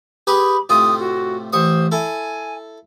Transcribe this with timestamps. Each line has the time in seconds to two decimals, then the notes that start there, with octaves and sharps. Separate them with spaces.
0.27 G4 G#4 B4 B5
0.69 A2 C3 F4 D#6
0.99 F#4
1.53 A1 C5 C#6 D#6
1.92 E4 A4 G#5